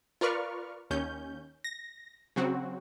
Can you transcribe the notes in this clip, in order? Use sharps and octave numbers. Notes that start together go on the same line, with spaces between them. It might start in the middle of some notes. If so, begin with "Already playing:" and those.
F4 A#4 B4 D5 C#6 F6
D#2 C#4 G6
A#6
C#3 F#3 C4 F#4